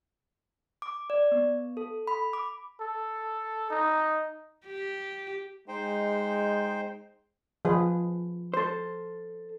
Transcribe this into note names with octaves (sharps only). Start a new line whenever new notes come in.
D6
D5
B3
A4
B5
D6
A4
D#4
G4
G#3 D#4 C5 G5
F3 G#4 B4
A4 C5